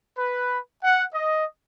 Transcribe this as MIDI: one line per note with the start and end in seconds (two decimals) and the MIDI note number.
0.17 0.59 71
0.83 1.03 78
1.14 1.45 75